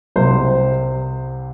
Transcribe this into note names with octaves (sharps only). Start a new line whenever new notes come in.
C2 C3 G3 C5